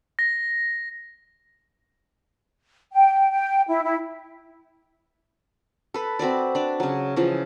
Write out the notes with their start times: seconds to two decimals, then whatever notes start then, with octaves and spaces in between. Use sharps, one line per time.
0.19 A#6
2.94 G5
3.32 G5
3.68 E4
3.83 E4
5.94 A4 B4
6.19 C4 F#4 B4 D5
6.55 D4 D5
6.80 C#3 F#3
7.16 C#3 E3 F3